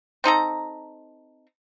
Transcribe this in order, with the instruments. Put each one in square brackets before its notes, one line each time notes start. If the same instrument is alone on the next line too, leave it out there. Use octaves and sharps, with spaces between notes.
[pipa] C4 D#4 A4 A#5